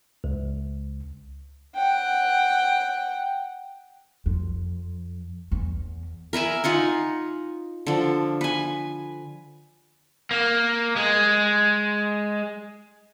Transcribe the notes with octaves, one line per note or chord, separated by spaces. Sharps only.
C#2
F#5 G5
F2
E2
A#4 B4 E5 G#5
D#4 F4 F#5 G#5
D3 F3
B4 G#5
A#3
G#3